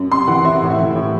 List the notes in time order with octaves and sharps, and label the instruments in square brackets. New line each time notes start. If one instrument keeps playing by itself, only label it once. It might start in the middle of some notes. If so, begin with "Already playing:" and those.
Already playing: [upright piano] F#2
C3 C6
E3 F#5
C3 E5
A2
E5
E3
A2